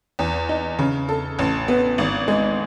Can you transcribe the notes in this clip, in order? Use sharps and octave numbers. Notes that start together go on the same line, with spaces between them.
E2
D#4
C#3
A4
A1
B3
G#1
G#3